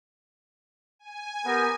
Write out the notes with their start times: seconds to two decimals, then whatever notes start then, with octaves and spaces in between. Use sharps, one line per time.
0.99 G#5
1.46 B3 G4 A#4